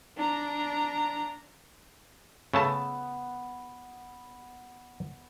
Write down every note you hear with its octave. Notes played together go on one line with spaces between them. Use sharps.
D4 A#5
C#3 A3 B3 A5